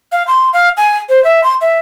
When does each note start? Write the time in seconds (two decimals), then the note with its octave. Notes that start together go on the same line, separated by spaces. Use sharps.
0.12 F5
0.27 C6
0.53 F5
0.77 G#5
1.09 C5
1.24 E5
1.44 C6
1.61 E5